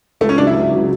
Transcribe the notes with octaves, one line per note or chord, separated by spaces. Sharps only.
C#2 A3
C#4
C#3 F#3 D4
E4
C#2
C#3 F#3